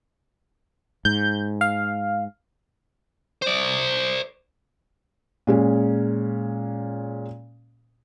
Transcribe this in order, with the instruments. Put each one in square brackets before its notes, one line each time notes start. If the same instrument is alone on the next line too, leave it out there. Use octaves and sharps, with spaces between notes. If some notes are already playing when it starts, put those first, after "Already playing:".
[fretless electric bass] G#2 [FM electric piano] G6
[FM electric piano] F5
[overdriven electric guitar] C5 D5
[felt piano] A#2 G#3 C#4